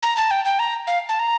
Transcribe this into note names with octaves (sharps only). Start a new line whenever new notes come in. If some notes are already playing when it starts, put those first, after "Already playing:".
A#5
A5
G5
G5
A#5
F5
A5
A#5